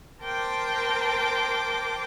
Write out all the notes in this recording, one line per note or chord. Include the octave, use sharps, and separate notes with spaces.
A#4 C5 G5 A5 D6